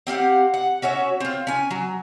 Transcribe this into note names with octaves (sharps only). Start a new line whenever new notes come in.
C4 G4 F5 F#5
F#5
C#4 F#4 C#5 E5
C4 F4
C#4 G#5
F#3